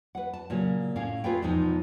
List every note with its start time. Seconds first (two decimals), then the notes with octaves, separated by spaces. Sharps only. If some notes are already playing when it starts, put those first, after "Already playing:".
0.15 B4 F#5
0.34 A5
0.50 A#2 C#3 F#3
0.96 A2 C#4 F5
1.24 F4 F#4 G#4 A4 B4 G5
1.42 E2 G#2 B2 F3 D#4